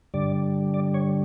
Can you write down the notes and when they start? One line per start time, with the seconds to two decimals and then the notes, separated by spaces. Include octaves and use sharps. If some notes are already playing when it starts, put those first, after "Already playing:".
0.14 G2 D3 G3 D5
0.74 D5
0.94 C#5